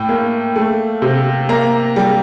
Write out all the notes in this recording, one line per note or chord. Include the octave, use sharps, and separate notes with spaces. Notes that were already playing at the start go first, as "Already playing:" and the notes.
Already playing: A2 G5
A#3
A3
C3
A#3 A#5
G3